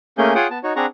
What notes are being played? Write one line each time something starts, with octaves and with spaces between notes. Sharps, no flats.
A3 A#3 C#4 G#4 G6
F4 G#4 C#5 F#5 G5 D#6
B3 A5
D#4 F#4 C#5
C4 D4 G#4 F#5 A#5 C#6